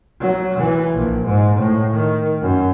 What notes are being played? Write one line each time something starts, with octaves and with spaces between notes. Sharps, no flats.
F#3
E3
A#1
G#2
A2
D#3
F#2